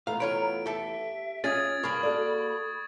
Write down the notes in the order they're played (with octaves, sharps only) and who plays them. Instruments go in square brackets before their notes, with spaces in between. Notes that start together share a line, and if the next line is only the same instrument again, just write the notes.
[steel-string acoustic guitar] E2 A3 B3 [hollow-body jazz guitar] F5 [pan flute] A#5
[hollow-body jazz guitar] F4 C#5 B5 [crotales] D7
[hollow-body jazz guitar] G4 A4 [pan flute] E5
[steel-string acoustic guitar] C#4 [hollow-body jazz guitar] F4 G#4 D#5 [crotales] D#6 G#6 A6
[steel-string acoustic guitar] G2 [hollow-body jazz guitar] A#3 G#4 A#4 [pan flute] B5 [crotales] C#6
[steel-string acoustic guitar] F#4 A4 D5